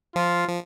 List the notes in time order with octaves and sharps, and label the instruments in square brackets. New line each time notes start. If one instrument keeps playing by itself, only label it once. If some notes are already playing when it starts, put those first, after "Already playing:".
[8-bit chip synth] F3 [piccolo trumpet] F4
[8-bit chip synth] F3